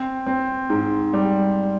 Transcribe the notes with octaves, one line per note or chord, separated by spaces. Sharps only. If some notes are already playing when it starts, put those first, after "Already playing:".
Already playing: C4
C4
G#2
G3